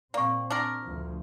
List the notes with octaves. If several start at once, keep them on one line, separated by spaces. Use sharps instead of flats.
A#2 A#3 C4 D5 C#6
D4 A#4
D2 F3